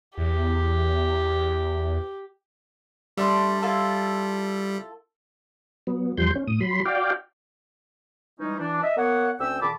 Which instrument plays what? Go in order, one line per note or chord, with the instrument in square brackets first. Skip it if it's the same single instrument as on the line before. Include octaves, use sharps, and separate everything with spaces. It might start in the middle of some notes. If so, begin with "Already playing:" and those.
[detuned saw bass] E2 [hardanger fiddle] G4
[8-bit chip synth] G3 [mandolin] A3 D4 C6
[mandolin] E4 F4 A4
[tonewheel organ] F#3 B3
E2 F3 G3 C6 G6
C#4
A2 D#6
F#3 B5 C6
F#4 D5 F5 G5
[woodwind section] E3 G3 G#3 C#4 D#4
E3 D4
D#5 E5
A#3 B3 C#5 F#5
D2 C4 C#4 G5 E6
A#2 D#3 G#4 A5 B5 D6